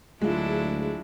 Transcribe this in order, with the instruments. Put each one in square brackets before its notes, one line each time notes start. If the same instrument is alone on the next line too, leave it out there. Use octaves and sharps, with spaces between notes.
[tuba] D2 [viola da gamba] F#3 D4 E4 [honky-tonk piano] G#3 F4